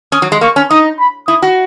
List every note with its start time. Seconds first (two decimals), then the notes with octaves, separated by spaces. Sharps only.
0.12 C#4 D#6
0.22 F#3
0.32 G#3
0.41 A#3 C#6
0.56 C#4
0.70 D#4 D#6
0.99 B5
1.28 E4 D#6
1.42 F#4